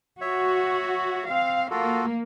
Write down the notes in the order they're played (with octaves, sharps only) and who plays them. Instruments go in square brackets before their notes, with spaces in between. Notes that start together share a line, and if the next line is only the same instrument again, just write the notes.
[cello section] F#4 [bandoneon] C#5 E5
[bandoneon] C4 [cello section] F5
[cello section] A#3 [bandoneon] F4 F#4 A4